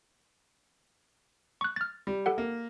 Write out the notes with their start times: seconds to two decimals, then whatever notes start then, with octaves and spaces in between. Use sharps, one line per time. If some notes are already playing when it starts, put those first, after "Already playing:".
1.61 C#6 F#6
1.76 F6 A6
2.07 G3
2.26 G4 A4 F#5
2.38 A#3